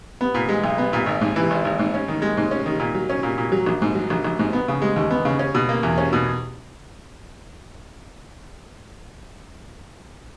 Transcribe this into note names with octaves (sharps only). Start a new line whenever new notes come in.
B3
A#2
G#3
B1
B3
A#2
G#1
G#2
E3
G#1
G#1
G#2
C#4
D#3
G#3
G#2
C#4
D#3
A#2
F#3
C#4
A#2
A#2
F#3
A#1
G#2
F#3
A#1
A#1
G#2
B3
C#3
G#3
D#2
B3
C#3
C#4
B2
A#3
E2
C#4
B2